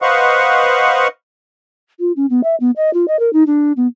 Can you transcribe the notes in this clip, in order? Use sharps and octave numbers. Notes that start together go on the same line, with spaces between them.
B4 C5 D#5 F5 F#5 C#6
F4
C#4
B3
E5
B3
D#5
F4
D#5
A#4
D#4
D4
B3